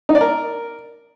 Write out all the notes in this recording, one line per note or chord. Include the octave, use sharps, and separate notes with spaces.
D#4
D5
A#4